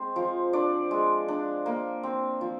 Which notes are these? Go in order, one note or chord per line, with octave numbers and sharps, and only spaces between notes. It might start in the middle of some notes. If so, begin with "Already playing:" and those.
Already playing: G#3 C4 C5
F3
D4 D5
G#3
D4
A#3
C4
F3